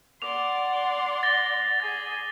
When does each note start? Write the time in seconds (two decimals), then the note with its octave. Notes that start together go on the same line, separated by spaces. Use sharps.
0.22 D5 F#5 C6 D6 F7
1.23 A6 A#6 G7
1.80 G#4 A6